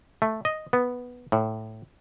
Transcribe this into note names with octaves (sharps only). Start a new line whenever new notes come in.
A3
D#5
B3
A2